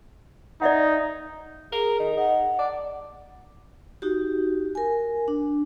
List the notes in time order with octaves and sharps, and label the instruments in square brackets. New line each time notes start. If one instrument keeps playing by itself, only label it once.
[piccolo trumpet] D#4 [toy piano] D5 E5 F#5
[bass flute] G#4 [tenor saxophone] A#4
[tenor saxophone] D#3
[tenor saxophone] D#4 [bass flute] F#5
[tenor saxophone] D5
[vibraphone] D#4 F#4 G4
A#4 G#5
D4